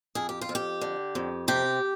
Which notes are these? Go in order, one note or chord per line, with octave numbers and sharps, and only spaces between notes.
F2 G#4
G4
F4
F2
G4
D3
F2
C3 G4